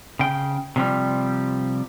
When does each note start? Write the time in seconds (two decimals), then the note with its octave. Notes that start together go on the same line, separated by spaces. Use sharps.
0.19 C#3 G5
0.76 C3 F3 G3